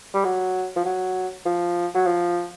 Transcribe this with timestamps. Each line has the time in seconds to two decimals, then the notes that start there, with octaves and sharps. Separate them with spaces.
0.14 G3
0.24 F#3
0.76 F3
0.85 F#3
1.46 F3
1.94 F#3
2.06 F3